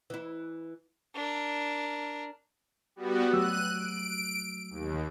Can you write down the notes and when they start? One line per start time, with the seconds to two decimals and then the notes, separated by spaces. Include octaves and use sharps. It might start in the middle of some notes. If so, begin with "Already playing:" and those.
0.10 E3 E4
1.14 D4 A#4
2.96 G3 B3 F#4
3.33 F#3 A3 E6 F#6 D#7
3.72 D7
4.70 D#2